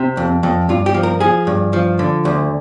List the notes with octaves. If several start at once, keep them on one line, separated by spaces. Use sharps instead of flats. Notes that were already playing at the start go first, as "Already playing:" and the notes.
Already playing: C3
F2
F2
G2 F4
G4
F3
A#4
F3 G#4
G2
F3
D3
D2